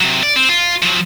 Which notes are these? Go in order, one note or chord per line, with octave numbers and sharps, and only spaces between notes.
C3 F#3
D5
C4
F4
F3 F#3